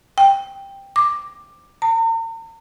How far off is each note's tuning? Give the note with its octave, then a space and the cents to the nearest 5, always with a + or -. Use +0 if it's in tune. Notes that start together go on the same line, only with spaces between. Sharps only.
G5 +10
D6 +10
A#5 -45